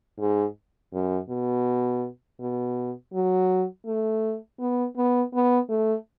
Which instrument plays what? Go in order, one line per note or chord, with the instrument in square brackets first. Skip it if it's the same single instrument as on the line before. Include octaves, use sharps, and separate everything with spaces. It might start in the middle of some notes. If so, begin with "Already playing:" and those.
[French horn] G#2
F#2
B2
B2
F#3
A3
B3
B3
B3
A3